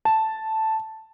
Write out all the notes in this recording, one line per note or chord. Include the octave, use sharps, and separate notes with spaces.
A5